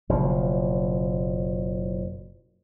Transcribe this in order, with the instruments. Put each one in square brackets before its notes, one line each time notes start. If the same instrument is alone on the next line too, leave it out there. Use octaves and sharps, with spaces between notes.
[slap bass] F#1 B2 F3